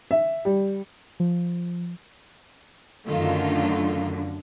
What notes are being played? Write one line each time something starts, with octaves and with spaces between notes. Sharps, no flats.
E5
G3
F3
F#2 D3 D#3 A3 F4